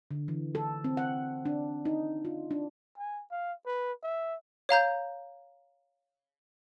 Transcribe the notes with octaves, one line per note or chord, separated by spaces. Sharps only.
D3
E3
A4
C4
F#5
D4
D#4
F4
D4
G#5
F5
B4
E5
C#5 F5 A#5 G6